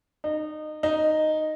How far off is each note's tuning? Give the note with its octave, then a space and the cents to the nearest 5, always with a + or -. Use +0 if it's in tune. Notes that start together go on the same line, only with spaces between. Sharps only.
D#4 -25
D#4 -5